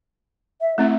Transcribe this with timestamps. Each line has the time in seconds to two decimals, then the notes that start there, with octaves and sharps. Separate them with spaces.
0.61 E5
0.78 A3 C4 E4 E5